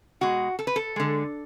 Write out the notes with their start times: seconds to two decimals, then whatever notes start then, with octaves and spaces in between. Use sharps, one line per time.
0.21 B2 G#3 F#4
0.59 A4
0.67 B4
0.76 A4
0.96 D3 G#3